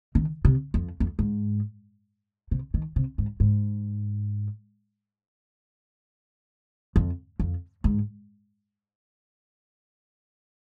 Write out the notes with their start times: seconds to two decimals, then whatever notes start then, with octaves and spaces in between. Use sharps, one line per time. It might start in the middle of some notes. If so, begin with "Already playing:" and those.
0.15 D#3
0.45 C3
0.74 F2
1.00 F2
1.19 G#2
2.51 C3
2.74 D#3
2.96 C3
3.18 G#2
3.40 G#2
6.96 F2
7.40 F2
7.84 G#2